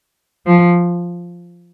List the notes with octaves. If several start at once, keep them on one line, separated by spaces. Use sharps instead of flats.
F3